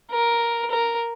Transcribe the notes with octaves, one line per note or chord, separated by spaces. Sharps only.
A#4
A#4